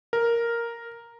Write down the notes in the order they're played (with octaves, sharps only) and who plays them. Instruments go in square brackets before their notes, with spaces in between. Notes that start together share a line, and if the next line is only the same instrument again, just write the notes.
[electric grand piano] A#4